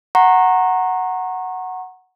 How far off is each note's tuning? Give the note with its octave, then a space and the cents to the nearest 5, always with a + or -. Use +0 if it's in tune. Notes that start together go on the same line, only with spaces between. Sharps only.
F#5 +0 A#5 +0 C#6 -30